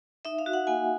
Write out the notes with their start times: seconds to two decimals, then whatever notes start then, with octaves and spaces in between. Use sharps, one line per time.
0.25 D#4 E5
0.39 F5
0.46 F#4
0.53 F#5
0.67 A#3 G#5